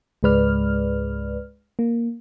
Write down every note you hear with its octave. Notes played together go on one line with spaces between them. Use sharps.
C#2 G#2 G#3 B4 D5 F6
A#3